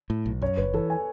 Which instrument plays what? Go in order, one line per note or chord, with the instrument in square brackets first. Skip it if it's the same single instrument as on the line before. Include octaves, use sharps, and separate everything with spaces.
[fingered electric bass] A2
B1
[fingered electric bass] F#2 [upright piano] C#5
[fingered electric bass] F#1 [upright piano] B4
[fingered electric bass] E3 [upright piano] A4
[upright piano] G#5